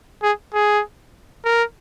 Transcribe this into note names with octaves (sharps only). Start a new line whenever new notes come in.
G#4
G#4
A#4